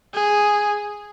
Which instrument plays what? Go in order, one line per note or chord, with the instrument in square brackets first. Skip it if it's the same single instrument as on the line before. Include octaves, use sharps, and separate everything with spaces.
[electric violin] G#4